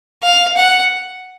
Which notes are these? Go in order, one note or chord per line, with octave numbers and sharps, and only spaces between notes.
F5
F#5